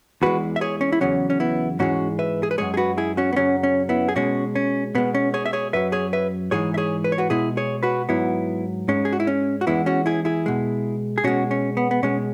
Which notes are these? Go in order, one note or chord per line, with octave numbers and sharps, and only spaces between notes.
E2 E3 G#3 F#4 B4
E5
G#4 C#5
C#4
E4
E2 C#3 F#3 C#4
C#4
B3 E4
G#2 E3 G#3 C#4 F#4
B4 E5
G#4
B4
F#2 E3 G#3 G#4 C#5
G#4
F#4 B4
E4 G#4
C#4 F#4
B3
F#2 C#3 F#3 C#4
C#4
B3 E4
G#4
B2 G#3 C#4 F#4
C#4
B2 G#3 B3
C#4
G#4 C#5
E5
G#4 C#5
F#2 F#3 B4 E5
G#4 C#5
B4 E5
G#2 E3 G#3 G#4 C#5
E5
G#4 C#5
B4
C#5
F#4 B4
B2 G#3 E4 G#4
G#4 C#5
F#4 B4
G#2 F#3 B3 E4
G#2 G#3 C#4
G#4
F#4
E4
C#4
F#4
E2 E3 G#3 B3 E4
C#4 F#4
E4 G#4
E4 G#4
B2 G#3
G#4
B2 G#3 C#4 F#4
C#4
B3
B3
B2 G#3 C#4